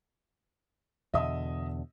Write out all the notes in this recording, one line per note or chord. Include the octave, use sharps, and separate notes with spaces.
E2 B2 D3 D#5 E5 D#6